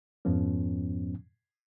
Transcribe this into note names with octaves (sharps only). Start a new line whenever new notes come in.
F2 G#2 F3 B3 C#4